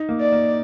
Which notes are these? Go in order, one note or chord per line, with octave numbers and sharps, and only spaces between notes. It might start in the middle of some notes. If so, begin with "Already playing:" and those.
Already playing: D#4
A#3
D5
A#3